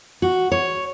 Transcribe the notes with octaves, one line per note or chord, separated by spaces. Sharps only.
F#4
C#5